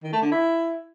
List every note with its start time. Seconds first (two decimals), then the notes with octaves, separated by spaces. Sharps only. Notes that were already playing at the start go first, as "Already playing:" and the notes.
0.03 D#3
0.13 A3
0.22 D3
0.31 E4